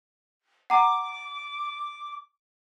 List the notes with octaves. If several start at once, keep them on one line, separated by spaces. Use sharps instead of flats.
F#5 A#5 D6